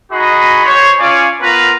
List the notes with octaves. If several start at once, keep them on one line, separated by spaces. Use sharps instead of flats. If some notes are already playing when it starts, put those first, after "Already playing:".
D#4 F#4 G#4 D#5 B5
C5 C#5
C#4 F4 C#5 D5 F5 G#5
B3 F4 A#4 B4 A#5